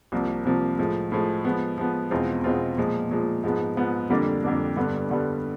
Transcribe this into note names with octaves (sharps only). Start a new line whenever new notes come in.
C2 C3 F3 A#3
C2 C3 F3 A#3
A2 F3 G#3
A2 F3 G#3
F3 G#3 B3
F3 G#3 B3
E2 B2 G#3 C4 F4
E2 B2 G#3 C4 F4
A#2 F3 G#3
A#2 F3 G#3
G#2 F3 G#3 B3
G#2 F3 G#3 B3
F2 D3 G3 A#3 D4
F2 D3 G3 A#3 D4
G2 D3 G3 B3
G2 D3 G3 B3